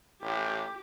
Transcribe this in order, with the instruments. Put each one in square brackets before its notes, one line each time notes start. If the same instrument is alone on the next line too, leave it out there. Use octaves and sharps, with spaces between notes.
[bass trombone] A1 [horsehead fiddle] G4